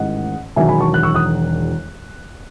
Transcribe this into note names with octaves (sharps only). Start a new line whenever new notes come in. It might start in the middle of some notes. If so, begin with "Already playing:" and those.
Already playing: A1 G#2 D#3 D#5 F#5
E1 E2 D#3 F#3 E5 G#5
G#5 B5
A5 C#6
F#6
C#6 E6
D#6 F#6